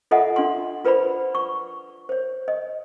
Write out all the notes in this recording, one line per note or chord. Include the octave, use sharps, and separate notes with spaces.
F4 A4 D#5 E5 F#5 G#5
D4 F4 F#5 C6
F4 B4 C5 D5 B5
C#6
C5 C#5
D#5